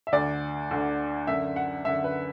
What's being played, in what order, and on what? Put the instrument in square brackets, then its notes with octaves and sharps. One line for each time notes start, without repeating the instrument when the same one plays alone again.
[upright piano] E5
D2 D3 D5
D2 D3
F#2 D3 E5
F#5
F#2 D3 E5
B4